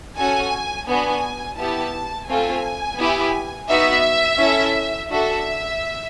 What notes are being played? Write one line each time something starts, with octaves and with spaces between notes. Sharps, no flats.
C#4 F#4 A4 G#5
B3 D4 F#4 G#5
B3 E4 G4 A5
A3 C4 F4 A4 G#5
B3 E4 G4
B3 D#4 F#4 E5
C#4 E4 A4
D4 F#4 A4 E5